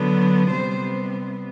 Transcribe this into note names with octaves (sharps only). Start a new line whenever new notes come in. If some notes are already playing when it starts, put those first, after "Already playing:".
Already playing: D3 F#3 B3
C3 G3 B3 C5